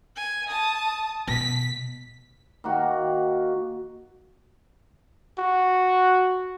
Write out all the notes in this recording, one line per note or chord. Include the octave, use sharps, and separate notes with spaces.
G#5
A5 D#6
B2 B6
D#3 A#3 F#4
F#4